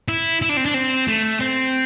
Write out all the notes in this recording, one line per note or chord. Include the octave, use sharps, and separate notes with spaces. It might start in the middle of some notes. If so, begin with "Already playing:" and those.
E4
E4
D4
C4
D4
C4
A3
C4